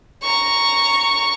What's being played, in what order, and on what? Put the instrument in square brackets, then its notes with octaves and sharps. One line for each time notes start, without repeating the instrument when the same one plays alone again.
[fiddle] A#5 C#6